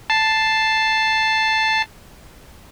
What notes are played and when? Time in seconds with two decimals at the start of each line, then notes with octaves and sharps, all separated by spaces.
0.10 A5 C7